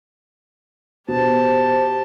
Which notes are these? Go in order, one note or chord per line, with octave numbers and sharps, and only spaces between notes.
B2 G4 C5 A5